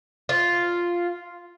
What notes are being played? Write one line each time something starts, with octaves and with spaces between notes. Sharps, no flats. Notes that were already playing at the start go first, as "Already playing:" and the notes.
F4